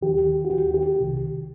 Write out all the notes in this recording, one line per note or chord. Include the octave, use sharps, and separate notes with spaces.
D#2 D#3 G4
F#4
D#2 D#3 G4
G4
C2 C3 D#3